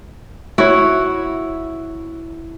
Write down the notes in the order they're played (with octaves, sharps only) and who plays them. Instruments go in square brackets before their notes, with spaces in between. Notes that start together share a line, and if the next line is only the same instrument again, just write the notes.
[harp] E4 [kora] F#4 C#5